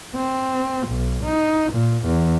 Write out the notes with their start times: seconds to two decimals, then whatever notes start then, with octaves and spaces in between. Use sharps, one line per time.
0.16 C4
0.88 B1
1.24 D#4
1.73 A#2
2.05 E2